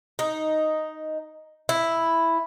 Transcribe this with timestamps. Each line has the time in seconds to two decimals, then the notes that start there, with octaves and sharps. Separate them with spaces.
0.19 D#4
1.69 E4